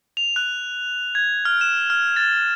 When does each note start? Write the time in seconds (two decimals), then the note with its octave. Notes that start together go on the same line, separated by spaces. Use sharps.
0.17 F7
0.36 F#6
1.15 G#6
1.45 F6
1.61 E7
1.90 F6
2.16 A6